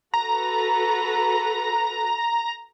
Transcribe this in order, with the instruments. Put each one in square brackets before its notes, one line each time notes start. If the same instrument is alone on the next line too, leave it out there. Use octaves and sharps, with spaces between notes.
[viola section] F#4 A4 B4 [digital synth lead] A#5